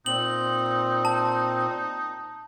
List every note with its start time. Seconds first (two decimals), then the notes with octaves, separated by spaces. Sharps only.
0.06 A#2 C4 D#4 F#7
1.05 A5